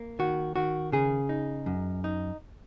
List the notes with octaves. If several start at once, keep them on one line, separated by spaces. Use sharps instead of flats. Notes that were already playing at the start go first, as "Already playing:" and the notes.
Already playing: A#3
D#3 F#4
D#3 F#4
C#3 G#4
D#4
F#2
D#4